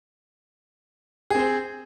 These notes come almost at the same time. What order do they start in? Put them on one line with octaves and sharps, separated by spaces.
G#4 C4 C5